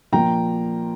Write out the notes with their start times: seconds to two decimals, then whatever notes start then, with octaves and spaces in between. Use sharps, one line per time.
0.12 A#2 F3 A#3 G5 A#5